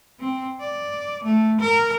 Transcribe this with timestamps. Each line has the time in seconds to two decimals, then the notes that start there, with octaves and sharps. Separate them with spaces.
0.20 C4
0.60 D5
1.24 A3
1.61 A#4